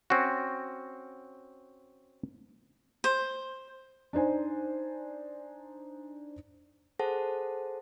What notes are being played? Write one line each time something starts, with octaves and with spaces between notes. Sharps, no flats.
C4 C#4 F#4
C5
D4 D#4 C5 G#5
G#4 A4 C5 F#5 A5